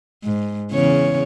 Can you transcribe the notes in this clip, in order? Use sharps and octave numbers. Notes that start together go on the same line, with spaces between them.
G#2
E2 C#3 C#5